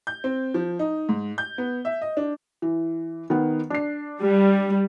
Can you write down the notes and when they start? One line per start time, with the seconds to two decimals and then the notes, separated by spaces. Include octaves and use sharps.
0.07 G6
0.24 C4
0.54 F3
0.79 D#4
1.09 G#2
1.38 G6
1.58 B3
1.85 E5
2.02 D#5
2.17 D4
2.62 E3
3.30 D#3 B3
3.70 D4 C7
4.22 G3